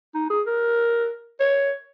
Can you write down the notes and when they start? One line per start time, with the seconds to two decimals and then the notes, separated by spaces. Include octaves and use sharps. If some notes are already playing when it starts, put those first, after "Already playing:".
0.14 D#4
0.30 G#4
0.46 A#4
1.40 C#5